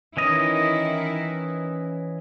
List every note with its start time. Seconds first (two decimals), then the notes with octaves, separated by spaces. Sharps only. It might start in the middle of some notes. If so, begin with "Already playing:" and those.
0.17 D#3 E3 C#4 E4 D#5